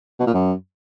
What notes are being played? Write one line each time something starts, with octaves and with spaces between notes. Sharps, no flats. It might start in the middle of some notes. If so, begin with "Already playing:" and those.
B2
A#2
F#2